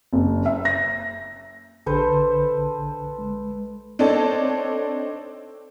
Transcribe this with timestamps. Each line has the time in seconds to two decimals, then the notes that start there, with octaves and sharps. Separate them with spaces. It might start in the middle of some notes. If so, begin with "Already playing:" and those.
0.13 F#1
0.46 E5
0.65 A#6
1.86 A#1 D3 A4 B4 C5
3.19 G#3
3.99 C4 D4 D#4 A4 C#5 A5